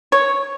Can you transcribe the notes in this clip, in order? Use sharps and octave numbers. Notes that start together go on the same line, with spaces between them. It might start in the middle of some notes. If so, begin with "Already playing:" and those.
C#5